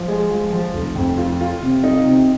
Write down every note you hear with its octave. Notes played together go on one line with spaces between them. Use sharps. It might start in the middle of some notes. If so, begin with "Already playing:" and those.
Already playing: F3
G#3
F3
F3
F1
F2
F4
F4
C3
D#4
C3